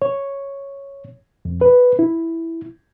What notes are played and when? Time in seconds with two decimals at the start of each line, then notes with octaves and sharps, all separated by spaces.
0.02 C#5
1.45 F2
1.61 B4
1.99 E4